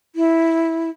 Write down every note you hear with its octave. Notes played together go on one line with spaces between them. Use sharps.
E4